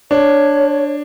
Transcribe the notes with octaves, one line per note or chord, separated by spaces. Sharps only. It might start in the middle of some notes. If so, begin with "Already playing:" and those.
D4 C#5